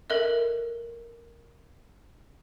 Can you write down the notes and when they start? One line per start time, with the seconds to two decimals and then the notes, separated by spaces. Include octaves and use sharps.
0.10 A4 A#4 D#5 E5